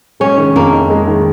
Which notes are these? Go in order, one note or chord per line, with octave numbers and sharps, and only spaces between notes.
G#3 C#4
D#3
F2 A#3
D#4
G#3
D#3